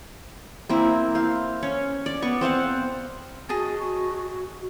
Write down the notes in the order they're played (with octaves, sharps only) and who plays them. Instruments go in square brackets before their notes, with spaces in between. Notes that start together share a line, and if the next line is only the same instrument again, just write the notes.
[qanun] A#3 C4 E4
C5 F5
C#4 C#5
D5
B3 C#6
C4 C5 F5 F#5
[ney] F#4 [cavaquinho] G#4 D#5 A5